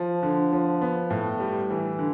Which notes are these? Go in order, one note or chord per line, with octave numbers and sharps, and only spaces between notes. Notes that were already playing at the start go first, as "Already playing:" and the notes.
Already playing: F3
D3
F3
B3
A2
G3
E3
D3